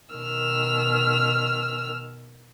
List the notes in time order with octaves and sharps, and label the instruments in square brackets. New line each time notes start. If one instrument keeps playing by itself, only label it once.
[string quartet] B2 D#3 E6 F6